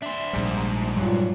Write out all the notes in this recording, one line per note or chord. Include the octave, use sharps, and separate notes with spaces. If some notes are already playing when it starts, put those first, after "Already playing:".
D4 C5 E5
A#1 G#2 G3
G2 A#2 F#3